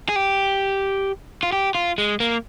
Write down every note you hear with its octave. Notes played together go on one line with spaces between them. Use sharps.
G#4
G4
F4
G4
F4
G#3
A#3